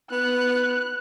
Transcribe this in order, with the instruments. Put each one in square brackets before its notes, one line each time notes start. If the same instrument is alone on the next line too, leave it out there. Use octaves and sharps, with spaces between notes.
[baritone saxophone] B3 [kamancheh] F#6